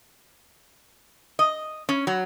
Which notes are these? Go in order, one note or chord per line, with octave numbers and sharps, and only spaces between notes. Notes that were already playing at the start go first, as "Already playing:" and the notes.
D#5
C#4
F#3